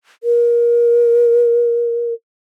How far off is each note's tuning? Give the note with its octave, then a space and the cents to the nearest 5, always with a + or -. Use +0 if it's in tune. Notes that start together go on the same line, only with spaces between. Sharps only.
A#4 +25